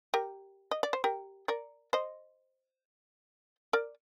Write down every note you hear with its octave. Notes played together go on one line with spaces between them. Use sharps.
G4 A#4
D#5
D5
C5
G4 A#4
A#4 D5
C5 D#5
A#4 D5